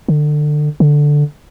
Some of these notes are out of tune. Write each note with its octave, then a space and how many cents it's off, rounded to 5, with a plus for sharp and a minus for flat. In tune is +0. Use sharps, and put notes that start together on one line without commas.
D3 +25
D3 +0